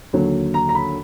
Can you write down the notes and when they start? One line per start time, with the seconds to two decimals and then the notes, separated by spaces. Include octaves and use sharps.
0.13 D#2 D3 F#3
0.54 A#5
0.69 A#5
0.75 B5